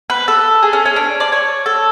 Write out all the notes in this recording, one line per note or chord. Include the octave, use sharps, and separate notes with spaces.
B4
A4
G#4
C#4
C#4
D4
D5
C#5
A4